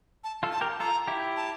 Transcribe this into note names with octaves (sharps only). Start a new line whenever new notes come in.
A5
F4 A4
A5
G4 A#4
F4 A4 A#5
E4 G4
A5